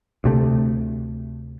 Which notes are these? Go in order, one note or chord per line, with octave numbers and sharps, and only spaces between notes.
D2 C3 A3